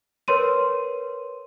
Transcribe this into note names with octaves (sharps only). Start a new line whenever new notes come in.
A#4 B4 C#5 C6 D#7